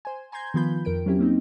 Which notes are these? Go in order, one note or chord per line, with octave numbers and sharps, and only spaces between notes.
C5 G#5
G#5 A#5 C6 G6 G#6
D#3 F3 B3 F4 B5 G6
F2 A#4 G5 D7
F#3 C4 C#4 E4 G4
A#3 C4 D#4